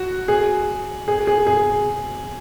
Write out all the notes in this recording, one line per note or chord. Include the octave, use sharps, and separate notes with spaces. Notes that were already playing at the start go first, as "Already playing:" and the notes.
Already playing: F#4
G#4
G#4
G#4
G#4